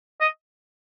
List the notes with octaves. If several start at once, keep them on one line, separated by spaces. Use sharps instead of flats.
D#5